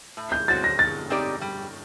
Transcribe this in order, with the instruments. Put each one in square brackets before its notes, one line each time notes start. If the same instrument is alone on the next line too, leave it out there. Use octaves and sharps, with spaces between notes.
[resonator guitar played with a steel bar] A2
[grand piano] G6
[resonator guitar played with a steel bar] F#3 C4 F#4 [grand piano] A6
[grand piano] A#6
[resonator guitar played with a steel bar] F#3 [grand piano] A6
[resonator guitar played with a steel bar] C4 D#4 G4 D5
G3